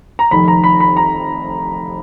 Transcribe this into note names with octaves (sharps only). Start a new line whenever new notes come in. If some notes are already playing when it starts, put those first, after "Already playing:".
A#5
F1 F2 D#3 B5
A#5
B5
B5
A#5